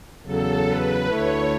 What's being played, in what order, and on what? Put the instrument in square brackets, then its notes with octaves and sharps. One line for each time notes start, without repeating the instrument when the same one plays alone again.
[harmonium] E2 C#3 F#3 [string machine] A4
[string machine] B4
[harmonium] D2 D3 A3 E4 A4 [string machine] C#5